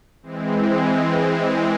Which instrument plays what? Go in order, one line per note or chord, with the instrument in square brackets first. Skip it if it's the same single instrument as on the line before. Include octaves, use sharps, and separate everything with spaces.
[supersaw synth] E3 G#3 C4